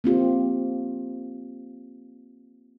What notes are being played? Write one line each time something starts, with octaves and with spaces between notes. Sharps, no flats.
A#3 C4 F4 G4